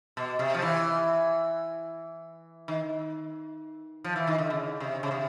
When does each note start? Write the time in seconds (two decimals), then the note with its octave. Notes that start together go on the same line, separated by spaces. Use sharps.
0.17 B2
0.39 C3
0.54 F3
0.62 E3
2.68 D#3
4.04 F3
4.16 E3
4.27 D#3
4.38 D3
4.50 C#3
4.80 C3
5.03 C#3
5.11 C3